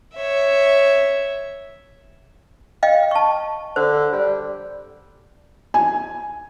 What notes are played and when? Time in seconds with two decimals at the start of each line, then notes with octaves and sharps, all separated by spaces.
0.15 C#5 E5
2.83 D#5 F5 G5
3.11 A5 C#6
3.76 D3 C5
4.12 G3
5.74 G#5